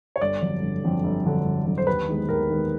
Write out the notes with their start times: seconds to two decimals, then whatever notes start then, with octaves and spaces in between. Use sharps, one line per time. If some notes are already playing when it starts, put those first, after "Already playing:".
0.16 C#5
0.21 G1 D5
0.42 F2 D3 F#3
0.62 G1
0.83 F2 D3 F#3
1.04 G1
1.25 F2 D3 F#3
1.46 G1
1.66 F2 D3 F#3
1.78 C5
1.87 D#2 B4
2.08 D#3 G#3 B3
2.29 D#2 A#4
2.50 D#3 G#3 B3